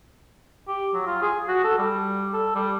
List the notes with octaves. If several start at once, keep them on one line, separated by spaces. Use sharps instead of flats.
G4
F#3
F4
G#4
F#4
A4
G3
A4
G3